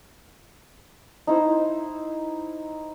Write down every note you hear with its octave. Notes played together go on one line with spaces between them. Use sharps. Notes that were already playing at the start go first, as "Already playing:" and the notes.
D#4 E4 C5